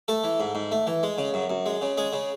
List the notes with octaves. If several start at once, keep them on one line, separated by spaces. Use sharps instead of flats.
A3 A4
E3
G#2
G#2
A3
E3
G#3
C#3
F#2
F#2
G#3
C#3
G#3 G#4
C#3